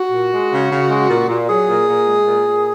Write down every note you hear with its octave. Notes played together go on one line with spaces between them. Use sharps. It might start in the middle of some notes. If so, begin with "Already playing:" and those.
Already playing: F#4
A#2
G#3
C#3
C#3
G#3
A#2
A#2
F#3 G#4
A#2
A#2
G#3
A#2
A#2